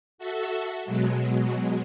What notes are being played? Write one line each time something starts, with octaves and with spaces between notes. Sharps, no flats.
F#4 A4 E5
B2 F#3 G#3